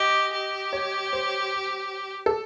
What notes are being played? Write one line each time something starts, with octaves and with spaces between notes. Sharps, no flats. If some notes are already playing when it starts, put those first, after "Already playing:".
Already playing: G4 D#5
G4
C#5
C5
A4